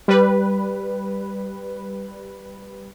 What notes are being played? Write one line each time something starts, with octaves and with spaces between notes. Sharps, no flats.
G3 B4